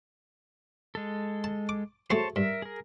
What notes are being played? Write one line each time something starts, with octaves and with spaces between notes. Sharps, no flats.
G#3 A4
A5
D6
A3 F#4 G#4 C5 C#5 A5
G2 A#4 E5
G#4 A#4